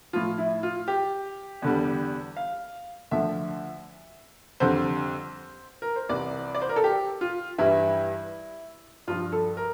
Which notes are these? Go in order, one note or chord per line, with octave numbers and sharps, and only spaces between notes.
A2 F3 F4
E4
F4
G4
E2 D3 G3
F5
D2 D3 F3 E5
F2 D3 G3 C5
A#4
C5
C2 C3 E3 D5
D5
C5
A#4
A4
G4
F4
G2 E3 G3 E4
G2 F3 F4
A4
A#4